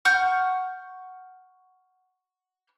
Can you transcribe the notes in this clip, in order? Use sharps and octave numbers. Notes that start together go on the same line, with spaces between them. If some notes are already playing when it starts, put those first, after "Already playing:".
F#5 C#6 F6 G6